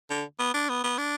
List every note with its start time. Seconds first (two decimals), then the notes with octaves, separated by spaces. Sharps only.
0.11 D3
0.40 B3
0.54 D4
0.70 B3
0.84 B3
0.98 D4